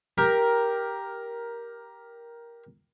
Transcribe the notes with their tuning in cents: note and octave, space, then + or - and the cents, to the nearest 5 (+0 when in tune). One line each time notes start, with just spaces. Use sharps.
G4 +0 A#4 +10